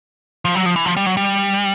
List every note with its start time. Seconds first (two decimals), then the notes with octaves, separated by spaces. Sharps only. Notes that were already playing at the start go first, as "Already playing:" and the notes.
0.45 F3
0.55 F#3
0.66 F3
0.76 E3
0.86 F3
0.97 G3
1.06 F#3
1.17 G3